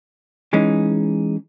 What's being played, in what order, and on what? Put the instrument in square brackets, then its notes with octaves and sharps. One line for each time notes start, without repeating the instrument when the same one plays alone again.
[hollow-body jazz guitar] E3 G#3 C#4 D#4